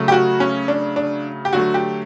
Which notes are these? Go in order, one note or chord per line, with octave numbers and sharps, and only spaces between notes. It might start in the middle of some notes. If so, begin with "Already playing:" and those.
Already playing: C#3 F#3 A3
G4
F#4
C#4
D4
D4
G4
D3 F#3 A3 F#4
G4